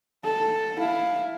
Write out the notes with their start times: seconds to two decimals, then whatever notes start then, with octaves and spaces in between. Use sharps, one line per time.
0.24 A4
0.79 E4 F5